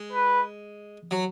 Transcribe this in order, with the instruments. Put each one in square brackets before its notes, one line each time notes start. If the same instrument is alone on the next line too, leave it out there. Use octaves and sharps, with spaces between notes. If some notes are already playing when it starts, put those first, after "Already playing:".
Already playing: [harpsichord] G#3
[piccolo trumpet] B4
[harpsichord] F#3